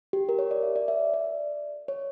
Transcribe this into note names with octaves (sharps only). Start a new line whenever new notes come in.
G4
A#4
C#5
D5
E5
D5
E5
D5
C#5